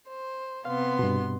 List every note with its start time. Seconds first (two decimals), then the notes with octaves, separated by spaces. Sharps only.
0.10 C5
0.65 C3 B3 F5 C6
0.99 G2 B2